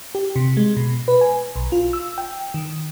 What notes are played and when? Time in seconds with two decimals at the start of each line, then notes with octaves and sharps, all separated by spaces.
0.15 G4
0.36 C3
0.57 G#3
0.76 B2
1.08 B4
1.21 G#5
1.56 B1
1.72 F4
1.93 E6
2.18 G5
2.54 D#3